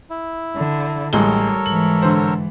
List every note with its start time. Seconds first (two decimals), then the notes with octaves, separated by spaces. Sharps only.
0.10 E4
0.56 D3
1.13 A1 G3 G#3 A4 A#4 C#5 G7
1.66 G#2 E3 F#7
2.02 D3 C5